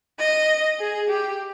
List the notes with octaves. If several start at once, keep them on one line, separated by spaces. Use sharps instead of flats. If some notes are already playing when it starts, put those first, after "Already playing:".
D#5
G#4
G4